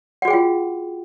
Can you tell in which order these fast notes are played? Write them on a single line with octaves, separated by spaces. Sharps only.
F#5 F#4 G#4 G5 F4